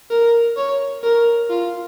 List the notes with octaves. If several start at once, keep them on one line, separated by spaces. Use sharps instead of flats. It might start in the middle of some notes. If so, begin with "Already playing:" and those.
A#4
C#5
A#4
F4